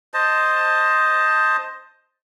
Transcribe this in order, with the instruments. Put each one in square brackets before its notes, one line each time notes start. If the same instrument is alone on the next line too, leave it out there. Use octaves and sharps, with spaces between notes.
[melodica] C5 D#5 A5